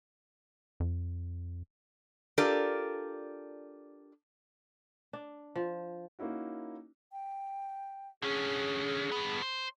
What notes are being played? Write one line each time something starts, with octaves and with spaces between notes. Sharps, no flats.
F2
D4 F4 G4 A4 A#4 D5
D4
F3
A#3 C#4 D#4 E4 F#4
G5
D3 C#4 G#4
G2 B3
C5